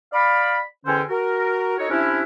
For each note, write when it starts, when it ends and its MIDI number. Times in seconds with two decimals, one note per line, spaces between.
0.13 0.58 74
0.13 0.58 77
0.13 0.58 83
0.86 1.01 40
0.86 1.01 50
0.86 1.01 61
0.86 1.01 72
0.86 1.01 79
0.86 1.01 80
1.09 1.78 66
1.09 1.78 70
1.78 1.87 63
1.78 1.87 66
1.78 1.87 69
1.78 1.87 73
1.90 2.23 48
1.90 2.23 61
1.90 2.23 62
1.90 2.23 64